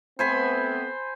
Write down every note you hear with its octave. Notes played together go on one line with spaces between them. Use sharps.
A3 B3 C4 C5 G#5 B5